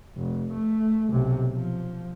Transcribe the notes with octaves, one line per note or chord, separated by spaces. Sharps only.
F1
A3
B1 C3
F3